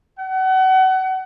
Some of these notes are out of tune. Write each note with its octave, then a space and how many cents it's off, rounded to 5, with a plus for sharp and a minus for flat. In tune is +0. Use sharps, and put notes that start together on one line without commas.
F#5 +30